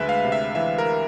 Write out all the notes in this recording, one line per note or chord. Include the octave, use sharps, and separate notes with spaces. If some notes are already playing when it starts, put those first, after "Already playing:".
Already playing: D2 G#3 B4 E5
F5
C3
E5
E3 E5
A#4